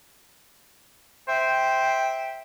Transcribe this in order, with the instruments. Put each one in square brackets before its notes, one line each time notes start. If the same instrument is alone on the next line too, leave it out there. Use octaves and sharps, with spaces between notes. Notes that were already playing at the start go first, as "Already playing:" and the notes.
[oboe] C5 [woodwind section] E5 G5